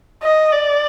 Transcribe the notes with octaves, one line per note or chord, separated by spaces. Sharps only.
D#5
D5